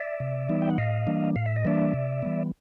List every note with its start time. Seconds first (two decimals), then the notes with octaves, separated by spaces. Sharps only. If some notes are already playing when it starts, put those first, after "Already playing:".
Already playing: D5 E5
0.20 C3
0.49 E3 G3 B3 D#4
0.62 G5
0.70 F#5
0.78 A2 D#5 F5
1.07 E3 G3 A#3 D4
1.36 A2 F5
1.46 E5
1.56 D#5
1.65 E3 G3 A#3 D4 D5 E5
1.94 C3
2.22 E3 G3 B3